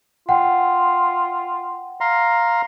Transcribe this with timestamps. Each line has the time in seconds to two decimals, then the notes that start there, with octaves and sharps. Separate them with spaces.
0.29 F4 F#5 G5
2.01 F5 A#5 C6